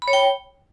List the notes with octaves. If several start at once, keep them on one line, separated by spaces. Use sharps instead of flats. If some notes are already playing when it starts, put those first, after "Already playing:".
B5
C#5
G5